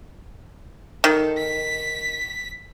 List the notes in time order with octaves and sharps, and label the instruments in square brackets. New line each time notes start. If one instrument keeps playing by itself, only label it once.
[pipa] D#3 [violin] A4
[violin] B6